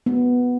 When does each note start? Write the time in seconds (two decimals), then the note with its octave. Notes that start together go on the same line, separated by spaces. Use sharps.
0.06 B3